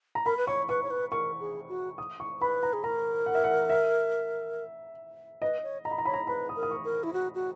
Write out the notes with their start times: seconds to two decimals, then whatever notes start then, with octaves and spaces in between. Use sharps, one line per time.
0.15 A#5
0.26 A#4 B5
0.37 B4
0.47 C#5 C#6
0.69 B4 C#6
0.83 C#5
0.90 B4
1.12 A#4 C#6
1.40 G#4
1.69 F#4
1.98 D#6
2.20 C#6
2.41 B4 B5
2.63 A#5
2.73 G#4
2.84 A#4 A#5
3.26 F#5
3.35 E5
3.44 F#5
3.70 E5
5.42 B4 D#5
5.63 C#5
5.85 D#5 A#5
5.91 B5
5.98 A#5
6.05 C#5 B5
6.14 A#5
6.27 B4 B5
6.49 D#6
6.56 A#4
6.63 D#6
6.71 C#6
6.85 A#4
7.03 E4
7.13 F#4
7.35 F#4